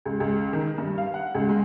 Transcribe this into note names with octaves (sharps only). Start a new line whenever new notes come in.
C#2
C#2
D#3
G2
F5
F#5
C#2
G#3